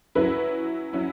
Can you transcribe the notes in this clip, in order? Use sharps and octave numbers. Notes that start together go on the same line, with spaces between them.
F#3 C#4 E4 B4
F#3 C#4 E4